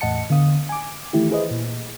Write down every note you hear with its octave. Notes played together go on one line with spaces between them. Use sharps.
E2 A2 D#5 F#5 A5 C#7
D3 B3 F5 D#6
G#5 D6
D#3 E3 A3 E4 G4
E4 G#4 B4 C5 D#5
A#2